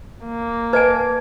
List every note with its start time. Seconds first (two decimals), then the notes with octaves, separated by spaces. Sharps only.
0.25 A#3
0.73 B4 D#5 G#5 A5 G#6